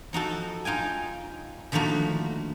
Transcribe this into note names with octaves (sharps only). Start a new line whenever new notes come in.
F3 D#4 F#4 A4
D#4 F4 G5 G#5
D3 D#3 F3 A3 A#3 F#4